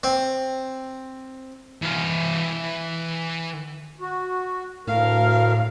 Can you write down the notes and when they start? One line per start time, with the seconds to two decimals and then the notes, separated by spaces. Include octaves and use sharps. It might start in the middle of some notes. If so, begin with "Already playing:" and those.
0.03 C4
1.82 E3 F5
4.01 F#4
4.87 D2 A2 A#4 F5